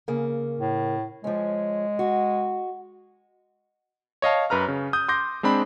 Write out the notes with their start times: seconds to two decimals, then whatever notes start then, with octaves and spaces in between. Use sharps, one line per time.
0.08 C#3 A#3
0.59 A2
1.24 F3 G#3 C#4
1.99 F#4
4.22 C#5 D#5 F5 A5
4.50 F#2 B4 A#5 F6
4.68 C#3
4.93 D#6 G6
5.08 C6 D6 G6 A#6
5.43 G#3 C4 D4 B5